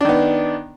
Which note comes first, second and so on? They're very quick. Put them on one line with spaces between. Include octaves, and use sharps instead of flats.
D4 D#3 B3